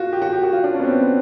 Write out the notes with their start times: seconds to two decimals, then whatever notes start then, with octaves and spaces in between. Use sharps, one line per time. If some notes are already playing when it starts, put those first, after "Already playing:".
Already playing: F4 F#4
0.13 G4
0.22 F#4
0.33 G4
0.43 F#4
0.53 F4
0.64 D4
0.74 C#4
0.79 B3
0.84 C4
0.94 B3